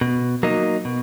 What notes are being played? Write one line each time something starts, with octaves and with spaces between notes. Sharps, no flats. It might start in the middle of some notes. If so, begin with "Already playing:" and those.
B2
F#3 A#3 D#4
B2